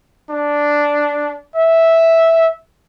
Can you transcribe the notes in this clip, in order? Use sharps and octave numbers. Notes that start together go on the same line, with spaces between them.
D4
E5